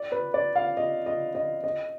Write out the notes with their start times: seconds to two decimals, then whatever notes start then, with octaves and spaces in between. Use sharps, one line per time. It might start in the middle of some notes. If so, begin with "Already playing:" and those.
Already playing: D5
0.12 B4
0.34 D5
0.56 F5
0.77 D#5
1.06 D#5
1.35 D#5
1.64 D#5